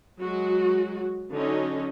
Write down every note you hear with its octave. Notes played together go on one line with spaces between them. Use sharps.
F#3 G#3 F#4
D3 F#3 C#4 D#4